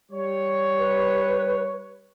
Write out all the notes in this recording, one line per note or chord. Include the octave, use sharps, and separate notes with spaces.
G3 C#5
B4